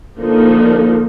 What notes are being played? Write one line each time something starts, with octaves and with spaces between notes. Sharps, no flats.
D3 F3 A#3 D#4